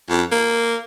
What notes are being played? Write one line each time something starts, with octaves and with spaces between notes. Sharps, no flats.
F2
A#3